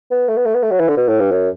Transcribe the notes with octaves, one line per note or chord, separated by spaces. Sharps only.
B3
A3
B3
A3
B3
A3
F#3
E3
D3
B2
A2
G2
F#2